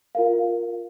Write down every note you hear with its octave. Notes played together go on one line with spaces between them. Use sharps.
F4 A#4 F5